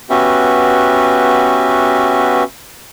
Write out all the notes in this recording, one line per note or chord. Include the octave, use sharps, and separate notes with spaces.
B3 C#4 F#4 G4 B4 E5